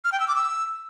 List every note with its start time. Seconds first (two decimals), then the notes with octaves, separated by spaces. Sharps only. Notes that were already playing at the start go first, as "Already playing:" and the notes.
0.05 F6
0.12 G5
0.20 E6
0.28 D6
0.36 E6